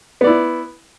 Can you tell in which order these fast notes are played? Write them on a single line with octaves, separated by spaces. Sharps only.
B3 D5 E4